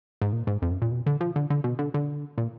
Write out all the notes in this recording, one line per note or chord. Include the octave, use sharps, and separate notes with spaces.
G#2
A#2
G#2
F2
F#2
A#2
B2
D3
F3
D3
D3
B2
D3
D3
A#2